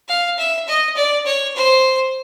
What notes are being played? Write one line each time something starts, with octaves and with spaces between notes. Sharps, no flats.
F5
E5
D#5
D5
C#5
C5